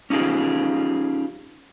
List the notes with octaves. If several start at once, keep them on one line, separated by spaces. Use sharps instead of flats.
C#4 D#4 F4 G4 G#4